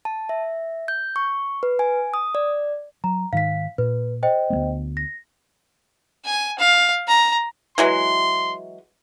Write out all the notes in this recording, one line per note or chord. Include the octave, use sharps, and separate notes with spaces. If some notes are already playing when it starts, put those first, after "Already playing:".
A5
E5
G6
C#6
B4
G#5
D#6
D5
F#3 A#5
G#2 D#3 F5 B6
A#2 B4
C5 D#5 G5
D2 A#3 B3
A#6
G#5
F5
A#5
E3 F#3 G#3 C6